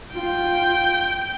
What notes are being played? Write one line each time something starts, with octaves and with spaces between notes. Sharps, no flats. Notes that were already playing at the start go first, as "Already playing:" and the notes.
F4 G5